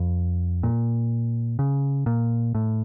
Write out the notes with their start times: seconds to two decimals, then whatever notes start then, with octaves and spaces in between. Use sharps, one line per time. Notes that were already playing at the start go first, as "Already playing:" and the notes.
Already playing: F2
0.63 A#2
1.59 C#3
2.06 A#2
2.55 A2